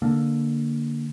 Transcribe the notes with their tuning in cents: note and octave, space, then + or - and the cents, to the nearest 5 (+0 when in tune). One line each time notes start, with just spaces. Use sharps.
D3 +0 A#3 +0